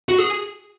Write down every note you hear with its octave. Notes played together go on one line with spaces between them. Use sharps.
F#4
G#4